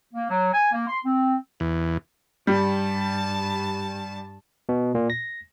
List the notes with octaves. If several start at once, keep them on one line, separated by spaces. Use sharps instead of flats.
A#3
F#3
G#5
A#3
C6
C4
E2
G2 G3 A5
B2
A#2
A#6